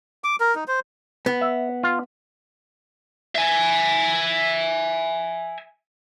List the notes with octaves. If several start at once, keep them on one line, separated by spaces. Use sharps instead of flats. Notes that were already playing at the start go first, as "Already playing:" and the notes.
D6
A#4
D#4
C5
B3
E5
F4
E5 G#5